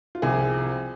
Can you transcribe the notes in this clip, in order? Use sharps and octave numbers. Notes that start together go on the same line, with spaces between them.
F4
C2 C3 F3 G#4